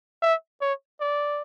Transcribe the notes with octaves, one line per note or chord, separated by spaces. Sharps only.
E5
C#5
D5